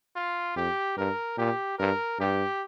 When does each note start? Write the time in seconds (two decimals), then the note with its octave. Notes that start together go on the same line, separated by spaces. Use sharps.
0.16 F4
0.56 F2 G4
0.97 G2 A#4
1.37 A#2 G4
1.78 G2 A#4
2.19 G2 G4